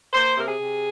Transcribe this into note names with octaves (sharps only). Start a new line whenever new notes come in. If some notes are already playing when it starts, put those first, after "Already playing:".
A#3 C5
C3 A#4
G#4
C3